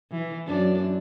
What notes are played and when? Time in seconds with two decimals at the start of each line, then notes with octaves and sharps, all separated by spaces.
0.11 E3
0.47 F#2 D4